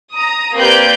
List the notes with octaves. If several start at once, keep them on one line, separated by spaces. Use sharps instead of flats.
A#5 D#6
A#3 C4 G4 B4 D5 G6